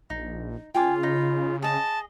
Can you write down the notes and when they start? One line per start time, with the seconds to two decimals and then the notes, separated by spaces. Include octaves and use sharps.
0.10 A#1 D#4
0.74 C#3 F4 G5 G#5 D6
1.03 D#4 B5
1.62 G#4 D#5 A5